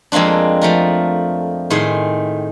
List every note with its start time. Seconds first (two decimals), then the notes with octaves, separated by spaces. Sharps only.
0.12 F2 G#3 A#3 C4 D4
0.61 F3 A3 A#4
1.70 A2 D#3 G#4 C5 C6